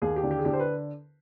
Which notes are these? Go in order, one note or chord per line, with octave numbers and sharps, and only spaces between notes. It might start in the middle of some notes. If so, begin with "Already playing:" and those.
D#2 G#4
G4
D3
G4
G#4
D3 G4
C5
B4